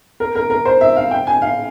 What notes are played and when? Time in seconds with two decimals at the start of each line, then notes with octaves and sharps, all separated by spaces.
0.20 A#4
0.35 A#4
0.50 A#4
0.65 C5
0.81 E5
0.96 F5
1.11 G5
1.27 G#5
1.42 F5